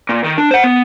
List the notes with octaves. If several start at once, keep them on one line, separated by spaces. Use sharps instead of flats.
A#2
D#3
D4
C5 F#5
B3